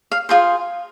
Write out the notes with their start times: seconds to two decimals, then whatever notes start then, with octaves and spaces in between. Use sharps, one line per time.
0.11 F5
0.29 F4 G#4 C5